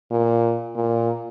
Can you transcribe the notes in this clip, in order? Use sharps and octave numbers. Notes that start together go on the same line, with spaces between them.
A#2
A#2